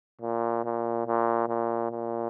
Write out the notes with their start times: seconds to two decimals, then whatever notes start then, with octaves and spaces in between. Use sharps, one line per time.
0.21 A#2
0.65 A#2
1.07 A#2
1.48 A#2
1.92 A#2